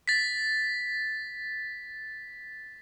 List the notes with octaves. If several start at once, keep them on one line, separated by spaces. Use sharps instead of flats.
A6 B6